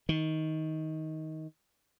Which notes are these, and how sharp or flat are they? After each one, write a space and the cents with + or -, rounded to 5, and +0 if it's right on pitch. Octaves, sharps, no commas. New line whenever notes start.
D#3 +15